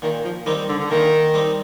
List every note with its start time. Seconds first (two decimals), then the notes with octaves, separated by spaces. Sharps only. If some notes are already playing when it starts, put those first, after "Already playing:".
0.02 A#2 D#3
0.25 F3
0.46 D#3 G3 C4 D#4
0.69 D3
0.79 D3
0.90 A#2 D#3
1.34 G3 C4 D#4